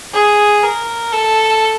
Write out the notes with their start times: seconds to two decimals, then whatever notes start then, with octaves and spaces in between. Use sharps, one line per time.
0.14 G#4
0.63 A#4
1.13 A4